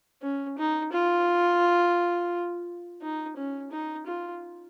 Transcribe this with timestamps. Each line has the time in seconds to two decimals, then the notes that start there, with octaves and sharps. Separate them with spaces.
0.22 C#4
0.58 D#4
0.93 F4
3.02 D#4
3.37 C#4
3.72 D#4
4.06 F4